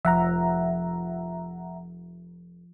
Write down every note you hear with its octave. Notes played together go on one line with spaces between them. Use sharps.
F1 F3 E5 F#5 A#5